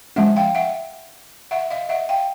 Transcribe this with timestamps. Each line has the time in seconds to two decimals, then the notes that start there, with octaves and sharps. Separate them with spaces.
0.16 F3 G#3 C#4 E5 F#5
0.36 F5 G5
0.55 E5 F#5
1.51 E5 F#5
1.70 D#5 F5
1.89 E5 F#5
2.09 F5 G5